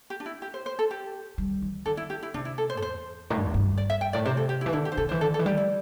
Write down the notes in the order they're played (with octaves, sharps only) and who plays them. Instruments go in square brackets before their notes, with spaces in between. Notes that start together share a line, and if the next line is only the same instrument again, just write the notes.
[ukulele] G4
D4
E4
G4
C5
C5
A4
G4
[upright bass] G3
E3
[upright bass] D3 [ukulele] A4
[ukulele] E4
G4
E4
[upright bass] C3 [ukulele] D4
[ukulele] E4
A4
C5
A4
[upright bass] E2 [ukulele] C5
[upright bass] A2
G2
E2
G2
[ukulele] D5
E5
G5
[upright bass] A2 [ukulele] D5
[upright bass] C3 [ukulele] C5
[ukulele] A4
G4
E4
[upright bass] E3
[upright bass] D3 [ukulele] E4
[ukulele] G4
C5
[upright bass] D3 [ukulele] A4
[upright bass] E3 [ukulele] C5
[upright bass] D3 [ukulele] A4
[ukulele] A4
[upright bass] E3
[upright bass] G3 [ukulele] G4
[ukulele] E4